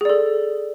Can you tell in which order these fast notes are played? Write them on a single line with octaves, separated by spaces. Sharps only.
G#4 D5 A4